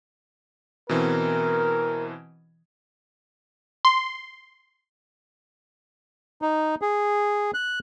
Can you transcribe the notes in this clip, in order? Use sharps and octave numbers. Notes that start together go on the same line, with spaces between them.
B2 E3 C4 A#4
C6
D#4
G#4
F#6